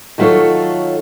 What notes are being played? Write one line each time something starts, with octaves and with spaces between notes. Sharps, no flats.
D#3 F#3 A3 F4 A4 C#5